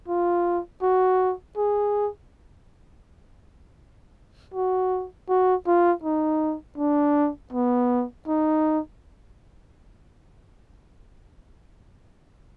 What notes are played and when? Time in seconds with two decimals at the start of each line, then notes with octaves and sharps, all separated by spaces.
0.08 F4
0.82 F#4
1.57 G#4
4.54 F#4
5.29 F#4
5.67 F4
6.04 D#4
6.78 D4
7.53 B3
8.28 D#4